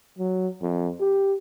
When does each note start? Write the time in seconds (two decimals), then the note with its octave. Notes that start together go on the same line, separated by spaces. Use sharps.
0.19 F#3
0.62 F2
1.01 G4